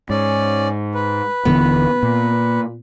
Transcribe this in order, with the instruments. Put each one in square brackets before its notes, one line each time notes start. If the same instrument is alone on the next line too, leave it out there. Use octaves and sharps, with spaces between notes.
[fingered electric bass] G#2 [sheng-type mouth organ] C#4 D5
[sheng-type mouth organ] B4
[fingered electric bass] D#1 D3 E3 [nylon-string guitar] B3
[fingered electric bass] A#2